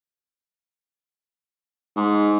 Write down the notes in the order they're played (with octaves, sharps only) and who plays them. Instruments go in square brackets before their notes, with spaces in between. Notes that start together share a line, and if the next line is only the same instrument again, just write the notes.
[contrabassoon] G#2